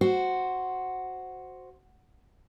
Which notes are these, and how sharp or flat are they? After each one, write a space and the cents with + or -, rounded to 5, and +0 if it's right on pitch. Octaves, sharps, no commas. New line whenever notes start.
F#4 +0 C5 +0